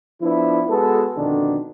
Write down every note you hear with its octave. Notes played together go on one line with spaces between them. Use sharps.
F3 B3 D4 E4
G#3 B3 F#4 A4
F2 B2 D3 D#3 D4